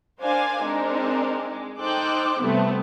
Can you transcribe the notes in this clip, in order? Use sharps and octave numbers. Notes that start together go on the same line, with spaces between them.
D4 A#4 C5 D5 F5 G#5
G#3 C4 D4 D#4 A#4
G#3
D#4 A4 C5 G5 D6 F#6
G2 C3 G3 A3 B3 C4